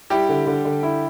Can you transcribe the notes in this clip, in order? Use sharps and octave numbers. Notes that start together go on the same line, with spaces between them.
G3 E4 G4
D3
D3
D3
E4